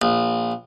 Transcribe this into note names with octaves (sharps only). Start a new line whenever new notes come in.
A#1